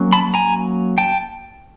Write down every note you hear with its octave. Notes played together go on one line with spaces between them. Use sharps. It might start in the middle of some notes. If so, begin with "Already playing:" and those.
Already playing: F#3 A#3 C#4
A5 B5
G#5 A#5
G5 A5